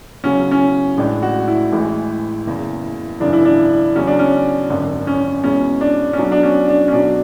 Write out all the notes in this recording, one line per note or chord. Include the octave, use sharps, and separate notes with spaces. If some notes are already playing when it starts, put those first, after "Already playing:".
E2 C#3 F#3 C#4
C#4
A1 A2 G#3 D4
F#4
E4
A1 A2 E3 G#3
F#1 E2 C#3
G#1 F#2 C#3 E3 D4
E4
D4
E2 C#3 F#3 C#4
D4
C#4
G#1 F#2 D3
C#4
E2 B2 G#3 C#4
D4
C#4
B1 B2 F#3 D4
D4
C#4
D4
C#4
B1 B2 F#3 D4